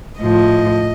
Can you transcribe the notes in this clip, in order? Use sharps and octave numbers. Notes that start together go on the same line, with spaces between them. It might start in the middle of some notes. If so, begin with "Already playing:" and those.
A2 F3 D#5